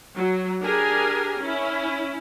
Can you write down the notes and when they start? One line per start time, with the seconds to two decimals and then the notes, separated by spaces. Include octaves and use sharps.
0.16 F#3
0.61 D4 G4 G#4 A#4 G#5
1.39 C#4 E4